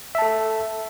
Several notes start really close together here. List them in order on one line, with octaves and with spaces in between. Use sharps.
E5 A5 A4